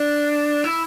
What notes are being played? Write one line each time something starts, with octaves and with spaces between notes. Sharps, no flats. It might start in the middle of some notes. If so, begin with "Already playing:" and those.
Already playing: D4
E4